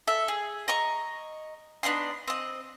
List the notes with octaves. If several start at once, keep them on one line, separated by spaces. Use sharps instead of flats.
A4 E5
G#4
D#5 A#5 C#6
B3 D4 D#4 C6
C4 D#5